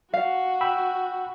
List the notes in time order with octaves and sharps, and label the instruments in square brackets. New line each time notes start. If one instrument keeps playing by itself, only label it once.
[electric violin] F#4 [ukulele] F5
[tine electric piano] G5 B5 E6